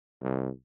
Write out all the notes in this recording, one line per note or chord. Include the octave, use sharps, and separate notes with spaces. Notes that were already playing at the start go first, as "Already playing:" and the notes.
C2